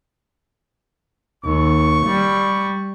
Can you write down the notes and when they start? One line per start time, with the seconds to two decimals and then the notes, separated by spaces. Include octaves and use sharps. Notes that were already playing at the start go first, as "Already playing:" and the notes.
1.45 D#2 C#6
2.07 G3